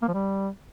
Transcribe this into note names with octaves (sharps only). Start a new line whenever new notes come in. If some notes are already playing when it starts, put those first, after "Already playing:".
A#3
F3
G3